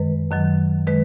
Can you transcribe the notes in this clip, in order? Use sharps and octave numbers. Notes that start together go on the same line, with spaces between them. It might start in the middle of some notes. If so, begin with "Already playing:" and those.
Already playing: F#2 D#3 G#3 B4
F#2 D#3 F#3
D#3 G#3 B4